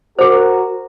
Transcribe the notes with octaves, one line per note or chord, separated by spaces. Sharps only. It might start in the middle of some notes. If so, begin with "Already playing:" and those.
F#4 G#4 A#4 C5